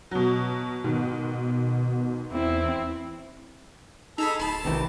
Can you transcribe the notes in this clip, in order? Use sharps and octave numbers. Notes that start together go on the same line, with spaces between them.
B2 F#3
G#2 B2 D#3
E2 C4 E4
D#4 G#4 A4 A#5 B5 E6
D1 A5 B5 C6
A#1 C3 D#3 E3